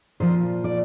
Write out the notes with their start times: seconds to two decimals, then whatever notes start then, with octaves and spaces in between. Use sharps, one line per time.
0.20 A#2 F3 C5
0.64 D5